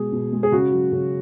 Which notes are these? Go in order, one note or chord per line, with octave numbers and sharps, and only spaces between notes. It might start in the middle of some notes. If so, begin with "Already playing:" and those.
Already playing: B2 G#3 G#4
B2
G#3
G#4
C#3 F#4
F#3
C#3